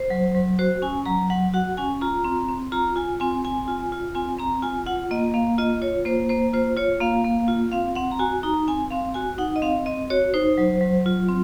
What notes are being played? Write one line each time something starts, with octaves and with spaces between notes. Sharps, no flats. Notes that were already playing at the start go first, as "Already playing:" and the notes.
Already playing: C5
F#3
F#3
F#4 C5
C#4 G#5
F#3 A#5
F#3 F#5
F#4 F#5
C#4 G#5
F4 A#5
C4
C4
F4 A#5
F4 G#5
C4 G#5
C4 G#5
F4
F4
C4 G#5
C4 A#5
F4 G#5
F4 F#5
A#3 D#5
A#3 F5
F4 D#5
F4 C#5
A#3 C5
A#3 C5
F4 C5
F4 C#5
A#3 F5
A#3
F4
C4 F5
C4 F#5
A#5
F#4 G#5
D#4 A#5
C4 G#5
C4 F5
F#4 G#5
D#4 F#5
D#5
C4 F5
C4 D#5
F#4 C#5
D#4 C5
F#3
F#3
F4
C4